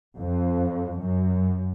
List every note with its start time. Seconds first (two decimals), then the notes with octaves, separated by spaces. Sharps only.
0.18 F2
1.01 F#2